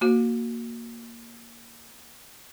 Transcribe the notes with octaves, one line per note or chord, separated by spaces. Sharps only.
A#3 F#4